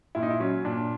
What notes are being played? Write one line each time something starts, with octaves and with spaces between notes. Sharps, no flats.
A#2 E4
D#4
E4
F#3 C#4
A#2 D4